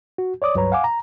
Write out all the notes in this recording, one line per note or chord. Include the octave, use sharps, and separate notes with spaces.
F#4
C#5 D5 D6 D#6
C#2 G2 F#3 B4 C#5 A#5
F5 F#5 G#5 D6
A#5